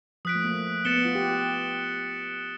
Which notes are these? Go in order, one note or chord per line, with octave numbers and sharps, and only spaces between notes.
F3 D#6 F#6 B6 D7
A3
A#3
B3 A6 C#7 E7 G7
B3
F4
G4
G4